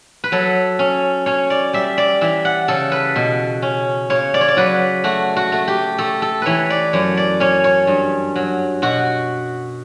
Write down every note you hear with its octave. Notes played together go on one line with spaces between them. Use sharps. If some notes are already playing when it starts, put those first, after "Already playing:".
B4
F#3 A4
C#4
C#4 C#5
D5
G3 E5
D5
E3 E5
F#5
C#3 A4
B4
B2
C#4
C#3 C#5
D5
C#5
D5
F#3 B4
A3 F#4
F#4
A3
G4
A3 A4
A4
E3 B4 C#5
D5
F#2 C#5
D5
C#4 C#5
C#5
G2
F#3
B2 F#4